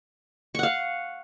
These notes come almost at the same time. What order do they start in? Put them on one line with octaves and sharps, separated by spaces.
C#6 F#5 F5